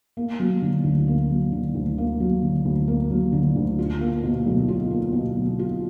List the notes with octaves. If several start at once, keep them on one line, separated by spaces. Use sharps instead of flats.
A#3
F#3
D3
D2
A#3
F#3
D3
D2
A#3
F#3
D3
D2
A#3
F#3
D3
D2
F4
A#3
B2
B1
F4
A#3
B2
B1
F4